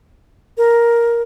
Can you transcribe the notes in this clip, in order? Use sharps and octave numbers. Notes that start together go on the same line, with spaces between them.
A#4